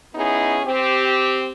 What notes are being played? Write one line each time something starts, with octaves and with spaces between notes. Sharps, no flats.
B3 C#4 D#4 E4 G#4
C4 G4